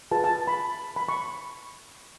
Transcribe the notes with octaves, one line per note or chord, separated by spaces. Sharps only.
F4 G#4 B4 A5
A5
B5
B5
C#6